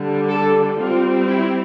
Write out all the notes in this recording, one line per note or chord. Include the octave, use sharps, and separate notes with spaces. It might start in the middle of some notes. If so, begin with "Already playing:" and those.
Already playing: D3 G3 D4
A4
G3 C4 F4
E4